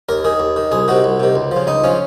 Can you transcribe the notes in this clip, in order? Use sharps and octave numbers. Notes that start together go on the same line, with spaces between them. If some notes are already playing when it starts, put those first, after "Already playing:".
D#2 A#4
D#3 G#4
D#2
D#3
C2 G#4
C3 D#3 F#4
C2
C3 D#3
C#2
C#3 F3
C#2 D#4
C#3 F3 C#4